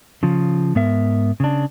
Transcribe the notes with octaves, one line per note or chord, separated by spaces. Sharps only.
C#3 F3
G#2 B3 A#4 E5
C#3 D4